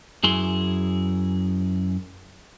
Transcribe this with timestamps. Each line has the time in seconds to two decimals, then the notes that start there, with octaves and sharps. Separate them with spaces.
0.24 F#2 E4 G#4 C6